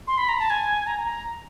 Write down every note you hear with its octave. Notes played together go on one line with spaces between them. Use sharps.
C6
B5
A#5
A5
G#5
A#5
A#5